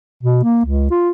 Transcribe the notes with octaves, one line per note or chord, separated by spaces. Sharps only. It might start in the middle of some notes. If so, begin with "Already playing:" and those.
B2
A#3
C#2
F4